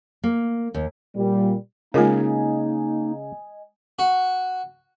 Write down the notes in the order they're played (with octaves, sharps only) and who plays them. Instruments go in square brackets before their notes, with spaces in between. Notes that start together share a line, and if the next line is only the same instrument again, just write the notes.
[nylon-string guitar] A#3
D#2
[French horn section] A#2 G3
[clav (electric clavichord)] C#3 [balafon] G#3 F4 A#4 [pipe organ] A#3 D#4 [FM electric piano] D#5 G#5
[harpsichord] F#4